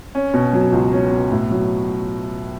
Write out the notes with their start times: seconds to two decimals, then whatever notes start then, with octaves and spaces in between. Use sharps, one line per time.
0.15 C#4
0.34 B2
0.53 F#3
0.72 C#2
0.92 C#4
1.12 B2
1.32 A2
1.51 F#3